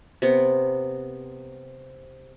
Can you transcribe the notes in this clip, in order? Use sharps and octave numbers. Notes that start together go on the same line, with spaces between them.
C3 B3